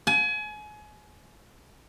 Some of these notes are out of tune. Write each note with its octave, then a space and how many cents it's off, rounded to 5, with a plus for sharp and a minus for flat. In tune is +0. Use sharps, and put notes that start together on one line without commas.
G#5 +30